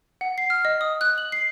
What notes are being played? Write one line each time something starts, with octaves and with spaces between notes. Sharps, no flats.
F#5
C7
F6
D#5
D#6
F#6
F#7
C7